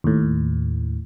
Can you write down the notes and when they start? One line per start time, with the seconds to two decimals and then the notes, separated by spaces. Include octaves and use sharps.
0.04 D#2 A2